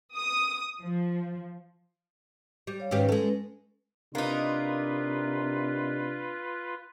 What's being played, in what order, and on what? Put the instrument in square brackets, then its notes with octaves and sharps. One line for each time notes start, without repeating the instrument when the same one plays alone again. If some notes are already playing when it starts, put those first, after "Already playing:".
[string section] D#6
F3
[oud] G3
[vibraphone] C#5 F5
[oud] G#2 D#3 G4 [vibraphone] C#4 B4
[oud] G#3 A4
[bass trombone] C3 [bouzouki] A#3 D#4 [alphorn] D4 [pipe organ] F4 B4